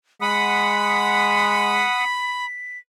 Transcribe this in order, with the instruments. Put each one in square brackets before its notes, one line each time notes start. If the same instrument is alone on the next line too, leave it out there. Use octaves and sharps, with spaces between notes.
[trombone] G#3 [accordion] F#5 D#6 [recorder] B5 [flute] B6